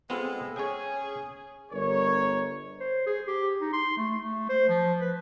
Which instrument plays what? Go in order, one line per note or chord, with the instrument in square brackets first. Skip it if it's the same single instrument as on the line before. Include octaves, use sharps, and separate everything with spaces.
[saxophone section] G#3 A4 [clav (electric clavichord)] B3 C4 F4
[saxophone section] C#4 G#4 [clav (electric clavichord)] C#5 G5
[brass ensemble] G1 A#4 C#5
[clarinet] C5
G#4
G4
D#4
C6
A3
A3
C5
F3
B4